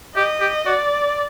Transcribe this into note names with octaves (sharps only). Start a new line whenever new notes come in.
G4 D#5
G4
F#4 D5